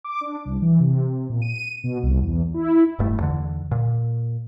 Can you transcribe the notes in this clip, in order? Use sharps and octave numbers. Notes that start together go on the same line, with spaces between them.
D6
D4
C2
E3
C3
A#2
D#7
B2
C2
E2
E4
E1 G2 A3
E2 D3
A#2